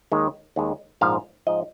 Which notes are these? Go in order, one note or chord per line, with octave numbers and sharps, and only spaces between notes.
D#2 D#3 G#3
D#2 D#3 G#3
A#1 G#2 F3 F5
G#2 F3 D#5